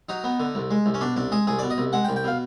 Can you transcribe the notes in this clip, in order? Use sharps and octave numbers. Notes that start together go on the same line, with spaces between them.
F#3 D#4
B3
D3
C2
G#3
C2
C#4
B2 D4
C2 D4
G#3 G#4
C2 G#4
B2 D5
D#5
C2
G#3 F#5
G5
C2
G5
B2 F5